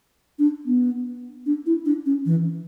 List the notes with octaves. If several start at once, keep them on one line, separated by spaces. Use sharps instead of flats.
D4
B3
D4
E4
D4
C#4
E3